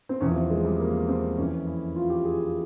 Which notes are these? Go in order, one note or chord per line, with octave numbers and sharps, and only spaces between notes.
C4
E2 C3 F3 C#4
C4
G#3
G3
A#3
C4
F2 E3 C#4
E4
F4
G4
G#4
F4